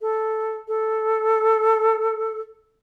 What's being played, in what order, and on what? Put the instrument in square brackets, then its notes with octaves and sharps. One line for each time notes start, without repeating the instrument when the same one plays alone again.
[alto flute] A4
A4